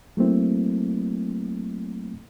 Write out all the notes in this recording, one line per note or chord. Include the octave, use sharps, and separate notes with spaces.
F#3 A3 A#3 C4 E4